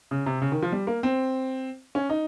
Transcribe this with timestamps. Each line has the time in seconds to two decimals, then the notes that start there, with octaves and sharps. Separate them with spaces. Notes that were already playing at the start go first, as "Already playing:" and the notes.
0.11 C#3
0.26 C3
0.42 C#3
0.52 D#3
0.62 F3
0.72 G3
0.87 A#3
1.03 C4
1.95 C#4
2.10 D#4